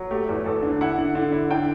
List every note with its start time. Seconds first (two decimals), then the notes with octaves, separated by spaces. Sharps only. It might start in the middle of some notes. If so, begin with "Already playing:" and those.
Already playing: F#3
0.11 A3 G4
0.29 E2
0.46 E2 A4
0.62 D3
0.81 E4 F#5
0.98 D3
1.15 D3
1.32 E4
1.51 D3 G5